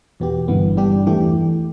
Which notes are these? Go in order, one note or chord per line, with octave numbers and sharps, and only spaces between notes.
E2 B2 B3 G4
G1 G2 E3 B3
G2 G3 D4 G4
E2 E3 A3 G4